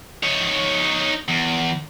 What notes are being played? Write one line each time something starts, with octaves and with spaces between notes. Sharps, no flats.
D#4 C#5
E2